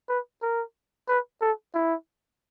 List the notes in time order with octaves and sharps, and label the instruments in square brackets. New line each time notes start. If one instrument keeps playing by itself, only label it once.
[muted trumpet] B4
A#4
B4
A4
E4